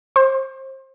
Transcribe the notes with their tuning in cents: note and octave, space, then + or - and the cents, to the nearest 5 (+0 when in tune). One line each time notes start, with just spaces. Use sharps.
C5 +30